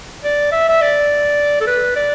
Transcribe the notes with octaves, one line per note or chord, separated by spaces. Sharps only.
D5
E5
E5
D5
A4
B4
D5